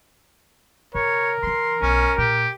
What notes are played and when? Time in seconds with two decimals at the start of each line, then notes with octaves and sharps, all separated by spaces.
0.95 C#3 A#4 C#5
1.43 C#3 E3 C6
1.82 B1 C#4
2.18 A#2 G4